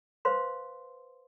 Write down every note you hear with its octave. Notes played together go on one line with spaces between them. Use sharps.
B4 C5 F5 C6